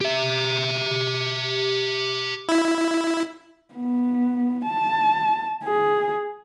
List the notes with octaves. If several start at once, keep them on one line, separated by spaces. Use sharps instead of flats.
G4 E5
E4
B3
A5
G#4